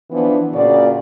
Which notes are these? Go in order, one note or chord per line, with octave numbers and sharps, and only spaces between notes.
E3 F3 B3 D4
A#2 C#3 F#4 D5